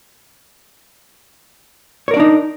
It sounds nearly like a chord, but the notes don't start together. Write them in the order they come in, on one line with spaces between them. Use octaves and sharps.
C#5 A#4 D5 D4 D#4